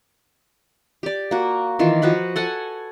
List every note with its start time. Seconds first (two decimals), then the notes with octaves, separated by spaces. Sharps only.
1.03 G4 D5
1.31 A#3 F#4
1.79 D#3 E3 F4
2.02 F3 F#4 B4 B5
2.36 A4 F#5 G#5